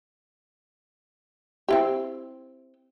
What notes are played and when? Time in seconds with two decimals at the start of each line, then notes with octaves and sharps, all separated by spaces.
1.69 C4 E4 G4